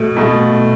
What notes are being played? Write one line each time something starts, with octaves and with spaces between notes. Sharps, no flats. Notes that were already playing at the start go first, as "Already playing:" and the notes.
Already playing: B2 A3
B2 A3